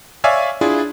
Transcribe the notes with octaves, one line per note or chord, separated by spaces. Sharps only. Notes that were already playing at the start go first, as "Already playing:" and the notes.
C#5 D5 E5 F5 G#5
D4 E4 F4 G#4